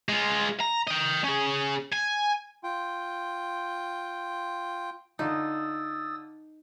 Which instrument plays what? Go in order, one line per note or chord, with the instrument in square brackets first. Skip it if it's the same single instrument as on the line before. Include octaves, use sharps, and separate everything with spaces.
[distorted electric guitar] G#3 F4
A#5
D#5 G5
C#4 G#4
G#5
[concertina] F4 G5
[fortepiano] D3 F4 [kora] D#4 [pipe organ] D#6 E6 A6